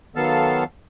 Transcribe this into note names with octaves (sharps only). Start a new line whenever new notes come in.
D#3 F#3 B3 A4 F5 A5